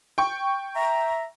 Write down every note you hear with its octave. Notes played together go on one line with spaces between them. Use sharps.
G5 C#6
E5 A#5